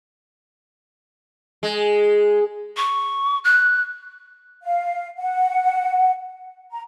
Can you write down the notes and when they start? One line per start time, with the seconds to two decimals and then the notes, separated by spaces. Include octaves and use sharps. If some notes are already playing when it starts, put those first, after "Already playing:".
1.63 G#3
2.77 C#6
3.44 F#6
4.63 F5
5.18 F#5
6.71 A#5